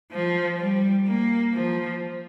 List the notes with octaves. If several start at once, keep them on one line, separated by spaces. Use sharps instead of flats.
F3
G3
A#3
F3